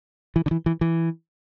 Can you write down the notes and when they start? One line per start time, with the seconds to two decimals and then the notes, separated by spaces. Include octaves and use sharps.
0.36 E3
0.46 D3
0.51 E3
0.66 E3
0.81 E3